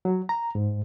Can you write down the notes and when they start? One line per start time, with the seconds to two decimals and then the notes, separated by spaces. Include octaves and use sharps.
0.05 F#3
0.29 A#5
0.55 G#2